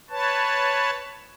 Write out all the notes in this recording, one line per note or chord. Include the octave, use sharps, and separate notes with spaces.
B4 C#5 A5